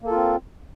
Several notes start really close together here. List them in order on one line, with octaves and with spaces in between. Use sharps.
A#3 A4 F4 C4